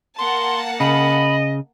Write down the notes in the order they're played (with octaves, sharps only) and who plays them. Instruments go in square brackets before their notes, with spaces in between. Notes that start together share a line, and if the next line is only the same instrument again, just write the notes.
[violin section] A#3 F#5 A5 [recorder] C6
[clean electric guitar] C#3 [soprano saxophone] D#5 [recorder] B5